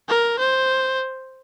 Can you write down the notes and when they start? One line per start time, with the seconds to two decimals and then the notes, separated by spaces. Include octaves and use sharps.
0.09 A#4
0.39 C5